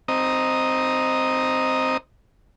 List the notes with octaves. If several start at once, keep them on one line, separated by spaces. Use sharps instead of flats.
C4 D#5 A#5 D#6